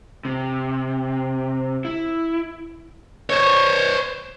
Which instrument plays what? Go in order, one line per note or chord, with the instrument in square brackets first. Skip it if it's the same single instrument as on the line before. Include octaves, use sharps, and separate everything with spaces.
[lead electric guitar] C3
E4
C5 C#5